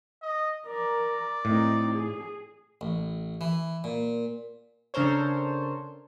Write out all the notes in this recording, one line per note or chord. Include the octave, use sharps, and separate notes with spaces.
D#5
A#4 D5
A2 C4 D#4
G#4
A1
E3
A#2
C#3 D4 A4 A#4 C5 C#5